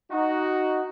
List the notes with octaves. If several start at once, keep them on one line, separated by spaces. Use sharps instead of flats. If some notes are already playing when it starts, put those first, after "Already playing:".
D#4 F#4